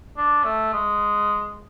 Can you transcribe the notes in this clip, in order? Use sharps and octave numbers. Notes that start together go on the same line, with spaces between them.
D4
A3
G#3